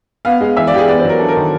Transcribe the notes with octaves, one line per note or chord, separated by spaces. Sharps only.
B3 F5
G#3
E3 E5
D5
E3 G4
G#4
B3 D5
C5
F#3
A#4
D4 A4
A#4
D#3